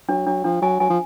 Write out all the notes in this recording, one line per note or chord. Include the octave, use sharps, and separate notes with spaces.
F#3 D4
F#3 D4
F3 D4
F#3 G#5
F#3 G#5
F3